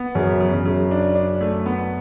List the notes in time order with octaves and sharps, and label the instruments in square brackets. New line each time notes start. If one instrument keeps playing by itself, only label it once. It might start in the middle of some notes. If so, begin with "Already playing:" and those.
Already playing: [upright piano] B3
[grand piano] F#2 [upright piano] C#3
[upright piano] C#3
[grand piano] F#2
[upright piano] C#3
D4
D4
A3
B3